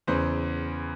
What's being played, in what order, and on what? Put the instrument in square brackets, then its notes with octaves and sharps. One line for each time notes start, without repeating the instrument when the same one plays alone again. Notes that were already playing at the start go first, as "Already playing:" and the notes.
[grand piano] E2 C#3 E3 C5